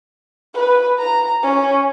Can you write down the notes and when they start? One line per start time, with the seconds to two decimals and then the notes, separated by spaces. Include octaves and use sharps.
0.54 B4
0.99 A#5
1.43 C#4